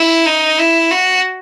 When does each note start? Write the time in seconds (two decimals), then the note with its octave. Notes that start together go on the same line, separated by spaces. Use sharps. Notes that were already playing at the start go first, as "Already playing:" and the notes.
Already playing: E4
0.26 D#4
0.59 E4
0.91 F#4